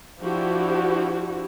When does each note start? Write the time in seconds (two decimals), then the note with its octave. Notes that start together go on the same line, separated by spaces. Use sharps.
0.21 F3 D4 E4 F#4 G4